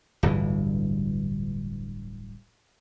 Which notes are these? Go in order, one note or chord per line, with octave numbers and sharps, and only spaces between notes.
D1 G1 G2 E3